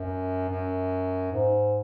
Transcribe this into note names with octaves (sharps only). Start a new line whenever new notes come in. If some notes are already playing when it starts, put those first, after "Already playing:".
Already playing: F#2
F#2
G#2